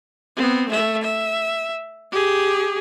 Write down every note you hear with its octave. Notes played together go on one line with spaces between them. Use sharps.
B3 C4
A3 E5
E5
G4 G#4